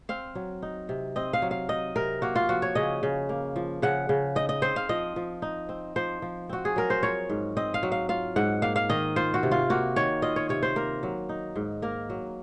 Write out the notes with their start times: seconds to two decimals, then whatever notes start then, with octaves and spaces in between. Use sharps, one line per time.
0.09 C4 F5
0.35 F#3
0.62 D#4
0.89 C3
1.16 C4 D#5
1.33 F5
1.42 F#3
1.51 F5
1.69 D#4 D#5
1.96 C3 A#4
2.22 A#3 F#4
2.36 F4
2.49 F3 F#4
2.62 C#5
2.75 C#3 D#5
3.03 C#3
3.29 A#3
3.56 F3
3.82 C#3 F#5
4.09 C#3
4.35 D#4 D#5
4.49 D#5
4.62 C4 C5
4.76 F5
4.89 F3 D#5
5.16 F3
5.42 D#4
5.69 C4
5.96 F3 C5
6.22 F3
6.49 C4 F#4
6.65 G#4
6.76 F#3 A#4
6.90 C5
7.03 F4 C#5
7.30 G#2
7.57 C4 D#5
7.74 F5
7.83 F#3
7.92 F5
8.09 F4 F5
8.36 G#2 F#5
8.62 A#3 F5
8.76 F5
8.90 D#3 D#5
9.16 F4 C5
9.34 F#4
9.43 C3
9.51 F4
9.70 A#3 F#4
9.96 D#3 C#5
10.22 F4 D#5
10.36 C#5
10.49 C3 C#5
10.63 C5
10.76 A#3 A#4
11.03 F#3
11.29 D#4
11.56 G#2
11.82 A#3 A#4
12.10 F#3